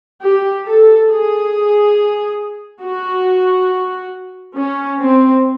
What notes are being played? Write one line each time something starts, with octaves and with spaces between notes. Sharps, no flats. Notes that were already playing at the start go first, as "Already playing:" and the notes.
G4
A4
G#4
F#4
C#4
C4